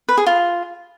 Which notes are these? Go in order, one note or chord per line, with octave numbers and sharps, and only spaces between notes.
B4
G#4
F4